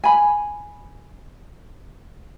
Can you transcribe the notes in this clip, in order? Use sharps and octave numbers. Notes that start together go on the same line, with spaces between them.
G#5 B5